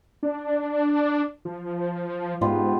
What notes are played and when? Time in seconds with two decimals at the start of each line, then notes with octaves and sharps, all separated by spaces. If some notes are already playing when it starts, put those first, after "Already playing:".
0.23 D4
1.45 F3
2.41 G#2 B3 F4 G4